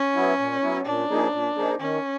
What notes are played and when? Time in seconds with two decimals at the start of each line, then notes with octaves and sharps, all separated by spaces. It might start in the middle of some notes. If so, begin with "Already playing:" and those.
Already playing: C#4
0.15 F#3 B3 E4
0.39 A#2
0.62 F#3 B3 E4
0.86 A#2 D4
1.10 F3 A#3 D#4 G#4
1.33 A#2
1.56 F3 A#3 D#4 G#4
1.80 D#3 C#4